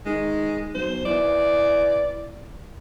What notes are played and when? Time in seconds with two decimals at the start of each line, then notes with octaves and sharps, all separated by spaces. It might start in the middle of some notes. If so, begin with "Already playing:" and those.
0.06 D#3 G#3
0.75 B1 C5
1.05 E3 D5